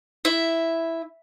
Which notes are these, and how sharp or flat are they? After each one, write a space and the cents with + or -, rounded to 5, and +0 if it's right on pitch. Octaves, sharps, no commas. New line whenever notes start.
E4 +0 E5 +0